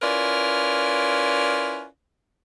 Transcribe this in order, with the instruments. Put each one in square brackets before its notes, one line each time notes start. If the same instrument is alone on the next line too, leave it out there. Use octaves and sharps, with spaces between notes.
[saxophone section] C#4 E4 F4 A#4 B4 D5